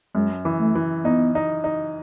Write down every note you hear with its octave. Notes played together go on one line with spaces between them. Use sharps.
F#2 G#3
E3
A3
E3
B3 D#4
D#4
D#4